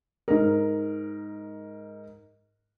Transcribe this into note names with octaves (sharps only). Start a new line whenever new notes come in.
G#2 A#4